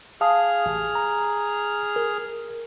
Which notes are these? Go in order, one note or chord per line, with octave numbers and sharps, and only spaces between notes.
G#4 F5 A5 D#6 F6
A1
A#5
A#4